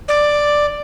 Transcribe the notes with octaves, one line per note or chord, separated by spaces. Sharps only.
D5